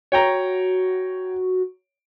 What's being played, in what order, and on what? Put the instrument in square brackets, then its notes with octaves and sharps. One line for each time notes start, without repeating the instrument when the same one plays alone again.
[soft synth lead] F#4 [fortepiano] C#5 G5 A#5